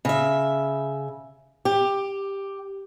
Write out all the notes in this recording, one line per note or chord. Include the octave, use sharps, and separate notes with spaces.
C#3 E5
G4